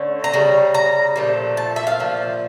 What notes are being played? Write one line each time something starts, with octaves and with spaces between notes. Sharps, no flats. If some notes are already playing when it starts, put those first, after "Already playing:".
Already playing: D3 A3 C#4
A#5
C#3 G3
A#5
A#2 F3 A3
A5
E5
F5
A#2 F3